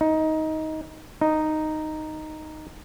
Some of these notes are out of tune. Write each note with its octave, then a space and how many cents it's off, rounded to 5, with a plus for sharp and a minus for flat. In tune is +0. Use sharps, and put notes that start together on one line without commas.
D#4 +15
D#4 -5